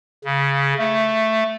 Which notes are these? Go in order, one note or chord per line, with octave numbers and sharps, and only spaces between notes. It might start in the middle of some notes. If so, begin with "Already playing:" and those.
C#3
A3